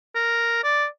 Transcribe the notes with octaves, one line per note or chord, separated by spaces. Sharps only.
A#4
D5